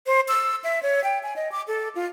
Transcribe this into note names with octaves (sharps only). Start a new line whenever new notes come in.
C5
E6
E5
C#5
G5
G#5
D#5
D6
A4
F4